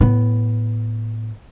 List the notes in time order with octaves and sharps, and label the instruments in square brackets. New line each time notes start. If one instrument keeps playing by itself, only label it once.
[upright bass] A2 B3